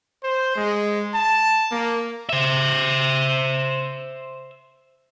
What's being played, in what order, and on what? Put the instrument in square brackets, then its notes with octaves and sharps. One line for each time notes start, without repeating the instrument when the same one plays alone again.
[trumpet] C5
G#3
A5
A#3
[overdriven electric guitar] C5 E5